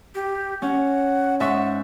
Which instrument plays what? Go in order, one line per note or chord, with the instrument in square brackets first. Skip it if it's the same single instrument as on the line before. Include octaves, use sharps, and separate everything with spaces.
[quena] G4
[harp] C#4 [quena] F#5
[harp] G#2 E5 C#6 [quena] F#5